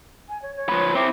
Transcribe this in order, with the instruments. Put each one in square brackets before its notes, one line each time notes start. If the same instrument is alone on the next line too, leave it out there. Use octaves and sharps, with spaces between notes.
[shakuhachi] G#5
C#5
C#5
[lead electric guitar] F3 B4
[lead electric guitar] C4 E4 [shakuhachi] D6